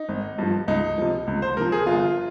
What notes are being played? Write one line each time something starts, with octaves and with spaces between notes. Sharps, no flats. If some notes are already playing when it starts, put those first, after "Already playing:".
Already playing: D#4
G#1
G2 F3
C#2 D#4
C3 F3
C#2
C5
C3 F3 A#4
G#4
G1 F4